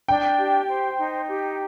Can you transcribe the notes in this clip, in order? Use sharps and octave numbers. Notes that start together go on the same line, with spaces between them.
D4 G5
G4
C5
D#4
G4